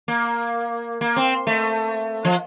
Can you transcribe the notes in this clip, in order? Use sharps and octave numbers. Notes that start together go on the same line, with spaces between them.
A#3
A#3
C4
A3
F3